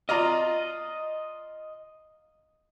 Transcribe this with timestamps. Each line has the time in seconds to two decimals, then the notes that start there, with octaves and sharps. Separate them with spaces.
0.09 F4 D5 D#5 A#5